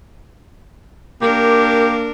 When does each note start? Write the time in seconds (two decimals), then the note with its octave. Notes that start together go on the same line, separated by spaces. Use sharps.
1.22 A#3 D4 G4 A#4